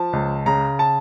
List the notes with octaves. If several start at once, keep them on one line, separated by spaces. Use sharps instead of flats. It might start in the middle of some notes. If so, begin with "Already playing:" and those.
Already playing: F3 A5
C#2
C#3 A#5
A5